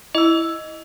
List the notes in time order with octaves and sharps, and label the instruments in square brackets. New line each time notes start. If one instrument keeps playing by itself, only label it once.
[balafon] E4 [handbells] D#5 E6